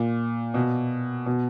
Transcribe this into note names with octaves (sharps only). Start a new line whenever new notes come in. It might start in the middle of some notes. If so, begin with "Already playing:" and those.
Already playing: A#2
B2
B2